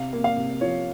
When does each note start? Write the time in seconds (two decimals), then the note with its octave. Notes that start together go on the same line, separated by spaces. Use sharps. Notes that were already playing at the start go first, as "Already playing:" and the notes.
Already playing: C3 F5
0.13 A#3
0.24 F5
0.37 C3
0.61 F3 C#5